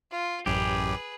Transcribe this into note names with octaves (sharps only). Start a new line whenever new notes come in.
F4
A1 F#2 G4 G#4 B4